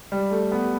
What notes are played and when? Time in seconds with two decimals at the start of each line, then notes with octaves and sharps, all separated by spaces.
0.12 G3
0.31 A3
0.52 B3